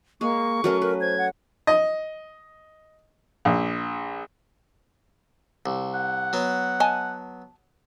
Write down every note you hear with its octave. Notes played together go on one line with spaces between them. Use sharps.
G#3 A#3 G#4 C#6
F#3 A3 C#4 A#4
A#4 B4
C5 G#6
F#5
D#5
A#1
C2
F#5
F#3 B3
D#5 G#5 A5